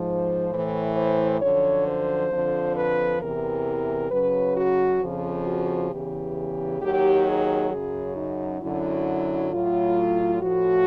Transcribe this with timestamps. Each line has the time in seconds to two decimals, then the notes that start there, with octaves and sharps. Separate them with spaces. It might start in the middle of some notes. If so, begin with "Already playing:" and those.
Already playing: G#2 F3 C5
0.51 A2 E3
0.96 C5
1.41 F#2 D3 F3 C#5
1.86 C5
2.31 F2 D3 F3
2.76 B4
3.21 E2 C3 E3 A#4
4.11 F#2 C#3 F#3 B4
4.56 F#4
5.02 F2 C#3 F3
5.46 F#4
5.91 E2 C#3 E3 G4
6.81 D#2 D#3 F#3 G4
7.27 G#4
7.71 F#2 C#3 F#3 G#4
8.17 D#4
8.61 F#2 D3 F#3 E4
9.52 A2 F#3 F4
10.42 A2 F3 F#4